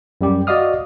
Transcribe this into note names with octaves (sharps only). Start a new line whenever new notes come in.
F#2 G3 G4
F#4 D5 D#5 F5 D#6 F6